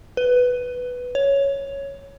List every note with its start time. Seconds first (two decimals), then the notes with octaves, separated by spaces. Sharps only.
0.17 B4
1.15 C#5